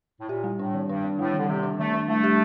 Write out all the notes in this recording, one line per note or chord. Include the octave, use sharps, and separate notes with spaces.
A2
A#2 G4
G3
A2 D4
D#3
G2 D4
D#3
A2 G3
D3 D#3
C3 D#3
D4
D#3 A3
D4
G3 A3
G4